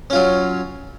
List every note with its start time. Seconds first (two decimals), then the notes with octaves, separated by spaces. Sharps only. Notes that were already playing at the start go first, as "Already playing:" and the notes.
0.10 C#4
0.13 F4
0.15 F#3